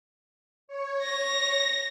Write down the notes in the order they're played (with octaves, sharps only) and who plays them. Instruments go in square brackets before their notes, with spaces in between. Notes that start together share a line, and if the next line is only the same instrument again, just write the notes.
[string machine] C#5
[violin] A#6